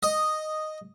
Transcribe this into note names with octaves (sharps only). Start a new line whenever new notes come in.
D#5